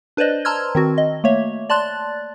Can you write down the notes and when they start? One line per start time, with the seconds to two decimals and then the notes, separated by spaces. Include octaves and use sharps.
0.17 D4 B4 C5 D5 D#5
0.45 A5 A#5 C6 E6 F6 G#6
0.75 D#3 C4 F#4
0.98 D#5
1.24 A3 A#3 C#5 E5
1.70 D5 A5 C6 F#6 A6